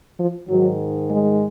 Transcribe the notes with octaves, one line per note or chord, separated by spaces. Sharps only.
F3
G#2 D#3 F#3
G#3